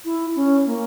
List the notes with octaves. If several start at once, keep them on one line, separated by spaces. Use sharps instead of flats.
E4
C#4
A#3